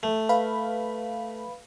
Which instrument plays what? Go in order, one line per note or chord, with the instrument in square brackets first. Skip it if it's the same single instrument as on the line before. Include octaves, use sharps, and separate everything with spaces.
[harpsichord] A3
[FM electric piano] B4 F5 B5